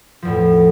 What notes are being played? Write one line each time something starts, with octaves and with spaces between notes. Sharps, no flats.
E2 A2 F3